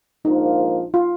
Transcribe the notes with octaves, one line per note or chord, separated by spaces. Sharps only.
A#1 G#2 F3 A#3 D#4 F4
F4